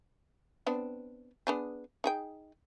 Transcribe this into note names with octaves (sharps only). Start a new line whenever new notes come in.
B3 C4 D4
B3 D4 G#4
D#4 G#4 G5